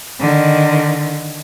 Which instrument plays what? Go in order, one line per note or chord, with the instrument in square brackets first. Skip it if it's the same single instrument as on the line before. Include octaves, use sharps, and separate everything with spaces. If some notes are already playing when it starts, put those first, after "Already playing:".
[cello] D3 D#3